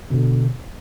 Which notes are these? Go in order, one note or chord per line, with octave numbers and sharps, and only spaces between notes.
B2 D3